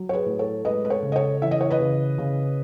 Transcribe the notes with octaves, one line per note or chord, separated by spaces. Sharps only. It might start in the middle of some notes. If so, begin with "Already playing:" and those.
Already playing: F#3
C#5
G#4 B4
A2
A4 C#5
G#3 B4 D#5
B4
A4 C#5
C#3
D#5
A4 C#5
E3 E5
D#5
C#5
B4 D#5
C#3
C#3